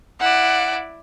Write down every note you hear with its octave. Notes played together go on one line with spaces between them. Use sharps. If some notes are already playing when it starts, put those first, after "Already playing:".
E4 D5 F#5